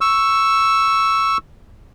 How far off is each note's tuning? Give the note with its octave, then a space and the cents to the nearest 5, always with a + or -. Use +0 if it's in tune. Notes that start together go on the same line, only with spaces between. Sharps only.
C#6 +0 E6 +0